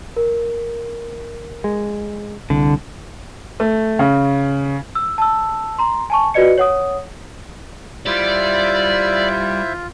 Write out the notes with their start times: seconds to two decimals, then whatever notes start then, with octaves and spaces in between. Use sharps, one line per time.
0.17 A#4
1.64 G#3
2.50 C2 D3
3.60 A3
3.99 C#3
4.95 E6
5.18 A5 E6
5.78 A#5 C6
6.10 G#5 A5 C#6
6.34 F4 F#4 B4 D5 D#5 C#7
6.58 C#5 F#5 D#6
8.06 G3 E4 F4 C5 D5 E5